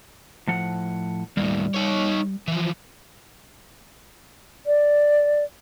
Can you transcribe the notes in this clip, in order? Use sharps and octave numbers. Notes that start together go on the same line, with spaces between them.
A2 F3 F#5
D#2 A2 G3
D#4 C#5
E3 F3
D5